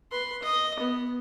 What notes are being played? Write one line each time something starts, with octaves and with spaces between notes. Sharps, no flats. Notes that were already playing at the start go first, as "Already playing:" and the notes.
B4 C6
D#5
B3